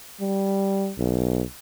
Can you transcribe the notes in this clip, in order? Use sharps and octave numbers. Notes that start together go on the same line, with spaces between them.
G3
B1